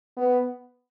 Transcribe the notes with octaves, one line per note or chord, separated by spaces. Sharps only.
B3